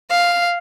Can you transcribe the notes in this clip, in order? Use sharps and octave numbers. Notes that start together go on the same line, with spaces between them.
F5